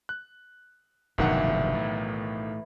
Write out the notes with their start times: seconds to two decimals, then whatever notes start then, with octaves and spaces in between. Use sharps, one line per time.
0.09 F#6
1.18 F1 B1 G2 A#2 D#3 E3 F#5
1.74 A2